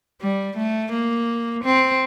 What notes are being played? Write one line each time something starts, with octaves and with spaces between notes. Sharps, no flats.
G3
A3
A#3
C4